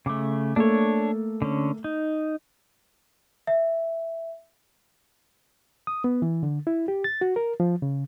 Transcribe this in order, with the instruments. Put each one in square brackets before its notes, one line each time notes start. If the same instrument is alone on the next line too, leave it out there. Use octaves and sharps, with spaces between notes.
[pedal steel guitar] C#3 A3 [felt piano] D6
[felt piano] A3 A#3 A4 [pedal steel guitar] D4 C#5
[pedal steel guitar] D3 C#4
D#4
[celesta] E5
[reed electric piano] D#6
B3
E3
D3
E4
G4
A6
F#4
A#4
F3
C#3